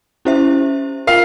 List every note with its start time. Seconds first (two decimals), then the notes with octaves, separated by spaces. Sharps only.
0.25 C#4 E4 G4 C5 E5
1.07 F4 A#4 F5